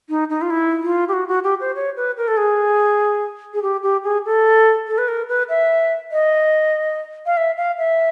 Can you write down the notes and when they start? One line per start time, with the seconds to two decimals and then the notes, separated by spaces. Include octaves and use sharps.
0.10 D#4
0.30 D#4
0.42 F4
0.50 E4
0.83 F4
1.08 G4
1.13 F#4
1.28 F#4
1.44 G4
1.60 C5
1.75 C#5
1.97 B4
2.17 A#4
2.28 A4
2.37 G#4
3.54 G#4
3.62 G4
3.83 G4
4.04 G#4
4.25 A4
4.88 A4
4.98 B4
5.08 A#4
5.29 B4
5.49 E5
6.12 D#5
7.26 F5
7.37 E5
7.57 F5
7.78 E5